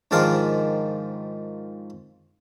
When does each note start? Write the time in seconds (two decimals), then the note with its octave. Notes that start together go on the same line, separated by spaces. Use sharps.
0.11 G#2 D#3 F3 D4 A#4 F5